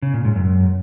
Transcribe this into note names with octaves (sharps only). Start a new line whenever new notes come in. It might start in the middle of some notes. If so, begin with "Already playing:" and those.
C#3
A#2
G#2
F#2